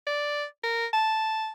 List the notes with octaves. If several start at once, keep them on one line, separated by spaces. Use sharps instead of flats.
D5
A#4
A5